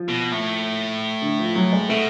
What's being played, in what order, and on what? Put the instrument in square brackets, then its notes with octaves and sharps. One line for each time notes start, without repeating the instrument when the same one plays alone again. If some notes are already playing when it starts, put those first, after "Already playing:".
Already playing: [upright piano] F3
[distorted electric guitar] B2
A2
[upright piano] D3
F3
F#3
G#3
[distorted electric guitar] B2 [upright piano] A3